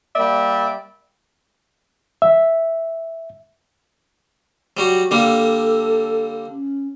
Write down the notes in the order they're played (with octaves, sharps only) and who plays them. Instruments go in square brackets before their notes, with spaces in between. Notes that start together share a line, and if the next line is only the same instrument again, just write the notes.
[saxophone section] G3 A#3 D5 E5
[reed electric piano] E5
[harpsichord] F#3 G3 F#4
[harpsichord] D3 G3 A#3 [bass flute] A4
[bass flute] C#4